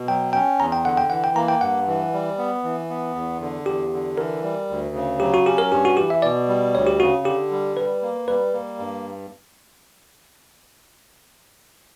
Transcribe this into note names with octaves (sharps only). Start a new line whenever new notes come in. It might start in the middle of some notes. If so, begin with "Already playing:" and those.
Already playing: B2
F#3 G5
C#4 G5
E2 A#5
G5
D3 F#5
G5
E3 F#5
G5
A#3 A#5
G5
G2 F#5
E3
G3
B3
E3
B3
E2
D3
E2 G4
D3
E3 A#4
G3
D2
C#3
F#3 G4
F#4
C#4 G4
A#4
G2 G4
F#4
E3 G4
E5
B2 D5
G3
D2 C#5
G4
C#3 F#4
D3 G4
G3
G3 B4
A#3
G3 B4
A#3
G2